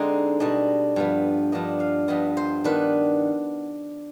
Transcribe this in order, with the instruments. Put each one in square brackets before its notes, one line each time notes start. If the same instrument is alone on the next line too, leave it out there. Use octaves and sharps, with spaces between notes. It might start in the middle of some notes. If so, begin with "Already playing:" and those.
Already playing: [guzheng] D3 G#3 C4 D#4
B2 G3 D4 D#5
G2 F3 B3
G2 F3 B3 D4 D#5
F5
G2 F3 B3 D#5
C5
D#3 B3 D4 B4